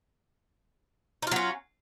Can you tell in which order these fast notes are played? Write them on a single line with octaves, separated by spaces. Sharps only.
D#4 F4 F#3 C#4